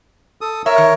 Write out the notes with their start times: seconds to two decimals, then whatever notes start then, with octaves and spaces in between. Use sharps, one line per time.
0.41 A4 D#6
0.66 A#4 C#5 E5
0.78 D#3